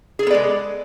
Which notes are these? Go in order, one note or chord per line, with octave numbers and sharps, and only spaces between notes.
G#3 B3 G#4 A4 D5